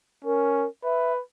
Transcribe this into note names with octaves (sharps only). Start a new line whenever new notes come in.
C#4 A#4
B4 E5